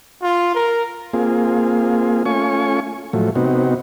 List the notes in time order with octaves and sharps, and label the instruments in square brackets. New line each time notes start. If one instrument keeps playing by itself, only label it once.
[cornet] F4
A#4
[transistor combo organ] A#3 C4 F4 G#4
A3 C#4 F4 G#5 C#6
A2 F3 F#3 A3
C3 B3 C4 D#4 F#4